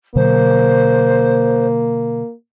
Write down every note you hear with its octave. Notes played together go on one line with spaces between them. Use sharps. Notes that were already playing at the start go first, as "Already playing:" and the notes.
B2 D3 F#3 A#3 C5